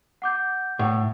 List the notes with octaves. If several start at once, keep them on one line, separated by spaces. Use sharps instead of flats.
F#5 D6 G6
A2 F#5